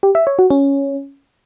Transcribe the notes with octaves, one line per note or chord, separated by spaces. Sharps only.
G4
E5
C#5
F#4
C#4